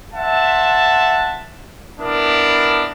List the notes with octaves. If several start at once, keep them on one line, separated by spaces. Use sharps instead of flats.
C5 E5 F#5 A5
B3 D4 E4 A#4